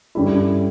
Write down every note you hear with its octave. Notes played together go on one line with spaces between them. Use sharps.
G2 D3 G3 C#4 E4